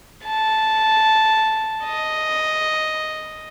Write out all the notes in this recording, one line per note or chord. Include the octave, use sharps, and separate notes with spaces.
A5
D#5